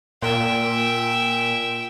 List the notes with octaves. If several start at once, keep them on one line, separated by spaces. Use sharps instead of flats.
A#2 E5 G5